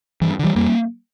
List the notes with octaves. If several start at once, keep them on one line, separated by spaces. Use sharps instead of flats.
G2 E3
D3
E3 G3
F2 G3 A#3